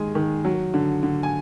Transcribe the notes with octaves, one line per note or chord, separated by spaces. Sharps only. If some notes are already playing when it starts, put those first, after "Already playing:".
Already playing: D#3 G#3 G#5
D#3
F#3
D3
D3
G#5